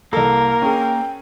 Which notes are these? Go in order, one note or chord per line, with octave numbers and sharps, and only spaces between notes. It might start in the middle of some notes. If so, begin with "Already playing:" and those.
C2 A#3 A4 A#4
C#4 G#4 G5